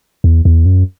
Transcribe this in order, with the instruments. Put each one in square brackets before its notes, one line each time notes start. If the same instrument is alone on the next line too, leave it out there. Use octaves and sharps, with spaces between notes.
[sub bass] E2
E2
F#2